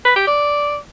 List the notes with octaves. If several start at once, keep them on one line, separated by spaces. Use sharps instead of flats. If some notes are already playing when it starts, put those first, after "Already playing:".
B4
G4
D5